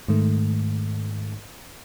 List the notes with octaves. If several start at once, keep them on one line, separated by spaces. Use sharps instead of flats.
G#2 D#3 A3